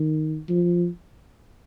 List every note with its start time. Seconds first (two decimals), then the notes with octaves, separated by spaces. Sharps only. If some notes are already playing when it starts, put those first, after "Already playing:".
Already playing: D#3
0.49 F3